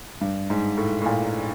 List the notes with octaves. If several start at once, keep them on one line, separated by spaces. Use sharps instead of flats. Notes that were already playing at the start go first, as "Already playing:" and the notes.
G2
G#2
A2
A2
A#2